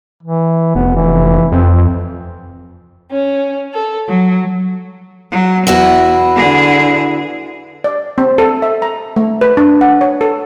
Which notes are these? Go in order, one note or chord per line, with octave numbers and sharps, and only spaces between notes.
E3
F1 B3
E3
F2 C4
C#4
A4
F#3
F#3
E2 E4 F#4 B4
D3 G#4
D5
C4
A4
E5
A#5
A3
B4
D4
F#5
C#5
A4